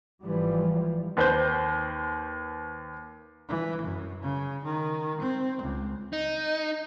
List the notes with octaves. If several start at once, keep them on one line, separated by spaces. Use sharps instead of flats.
G#1 E3 F3 G3
D#2 B4 C5 G6
E3
F#2
C#3
D#3
C4
C#2
D#4